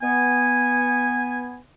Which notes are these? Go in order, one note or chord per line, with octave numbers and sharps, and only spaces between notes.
B3 G#5